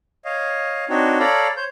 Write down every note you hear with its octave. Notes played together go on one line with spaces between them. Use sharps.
C#5 D#5 F5
C4 D4 D#4 F#4 C#5
A4 C#5 D5 F5 A#5 B5
C5 C#5 G6